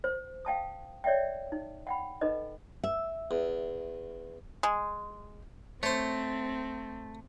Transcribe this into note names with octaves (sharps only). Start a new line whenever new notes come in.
C5
F5 G5 A5 D#6
C#5 D5 E5 F5 G5
D#4
F#5 G5 B5
D#4 A4 B4 D#5
E5
E2
G#3
A3 C4 C5 C#5